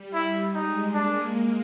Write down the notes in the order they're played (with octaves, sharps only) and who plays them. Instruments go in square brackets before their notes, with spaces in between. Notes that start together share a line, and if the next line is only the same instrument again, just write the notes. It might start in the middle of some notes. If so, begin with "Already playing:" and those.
Already playing: [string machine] G3
[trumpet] E4
[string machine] G#3 [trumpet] D#4
[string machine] A#3 [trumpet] D4